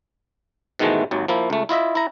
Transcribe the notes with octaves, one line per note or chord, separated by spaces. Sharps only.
G#2 B2 D#3 E3 G#3 A3
G#1 D#2 F#3
F3 A#3 E4
C#2 A3
E4 F4 D#5 E5
E4 A#5